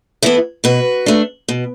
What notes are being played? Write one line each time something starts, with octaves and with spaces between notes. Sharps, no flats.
E3 B3 E4 A4
B2 F#4 B4
A3 D4
B2